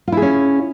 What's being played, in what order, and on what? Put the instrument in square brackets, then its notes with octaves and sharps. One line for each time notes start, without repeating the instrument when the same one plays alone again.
[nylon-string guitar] F4
E4
G#4
C#4